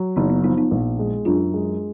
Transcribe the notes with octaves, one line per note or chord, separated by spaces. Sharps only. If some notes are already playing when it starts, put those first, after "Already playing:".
Already playing: F#3
F#1 B3 D#4
B3
F3 B3 D#4
B3 D#4
A#1
G#3
F#2 D4 F4
G#3